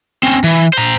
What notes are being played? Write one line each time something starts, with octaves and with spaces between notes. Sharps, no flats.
C4 C#4
E3
C5 A#5